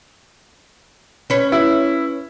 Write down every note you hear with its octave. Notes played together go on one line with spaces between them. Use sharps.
C#4 B4 C#5
E4